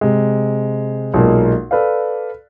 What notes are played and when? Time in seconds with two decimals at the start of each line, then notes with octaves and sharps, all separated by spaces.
0.01 C3 G#3
1.14 B1 A#2 G#3 A#3
1.71 A4 B4 D5 F5